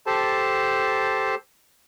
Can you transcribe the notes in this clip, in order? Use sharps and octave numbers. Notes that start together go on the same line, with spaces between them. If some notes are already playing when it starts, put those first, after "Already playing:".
G4 A4 C5 A5